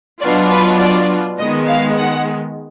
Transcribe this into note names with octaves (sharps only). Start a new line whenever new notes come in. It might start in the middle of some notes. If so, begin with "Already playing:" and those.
B2 F#3 D4 F4 D5
B4
D5
D#3 G#3 B3 D#5
F5
F#5